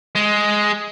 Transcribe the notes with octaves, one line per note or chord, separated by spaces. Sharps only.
G#3